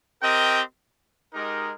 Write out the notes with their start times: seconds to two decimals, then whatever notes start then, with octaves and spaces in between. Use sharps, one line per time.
0.21 C4 G4 A#4 D#5 G5
1.33 G#3 D#4 G4 A#4